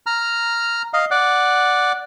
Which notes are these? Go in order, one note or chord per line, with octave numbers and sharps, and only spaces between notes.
A#5 F6
D#5 F5
D5 F#5